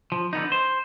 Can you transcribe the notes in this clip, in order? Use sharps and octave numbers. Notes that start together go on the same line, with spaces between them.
F3
D3 B3 D#4
C5